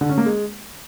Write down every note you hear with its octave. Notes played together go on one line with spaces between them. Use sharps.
D3
C#4
A#3
G#3